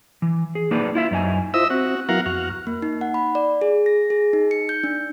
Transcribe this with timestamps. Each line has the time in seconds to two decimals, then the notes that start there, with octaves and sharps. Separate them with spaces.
0.22 E3
0.55 G#4
0.71 A#3 D4 D#4 B4
0.95 E4 F4 E5
1.11 F#2 D#4 G#5
1.54 E4 F4 C5 D#5 E5 E6
1.70 C4 F#4
2.09 F#3 B3 E4 A#4 F5 F#5
2.26 F2 F#4 F6
2.67 A#3
2.82 D#4
3.01 F#5
3.14 B5
3.35 D5
3.61 G#4
3.86 A#6
4.10 G#4
4.33 D#4
4.51 C#7
4.69 G6
4.84 D4